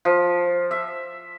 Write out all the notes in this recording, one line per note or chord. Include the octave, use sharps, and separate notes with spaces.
F3
E5